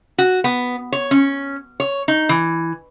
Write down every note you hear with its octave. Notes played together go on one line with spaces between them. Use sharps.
F#4
B3
C#5
C#4
C#5
D#4
E3